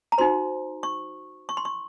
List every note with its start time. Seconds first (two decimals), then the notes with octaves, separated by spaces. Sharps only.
0.12 A#5
0.18 D#4 F#4 C5 C6
0.83 C#6
1.49 C#6
1.57 C6
1.65 C#6